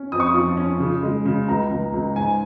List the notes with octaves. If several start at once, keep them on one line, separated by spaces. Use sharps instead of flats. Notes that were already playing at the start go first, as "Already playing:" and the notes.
Already playing: C#4
F2 D#6
C#6
D#6
F3
C#4
C#3
G#3
C#3
C#2 A#5
C#2
C#2
G#2 G#5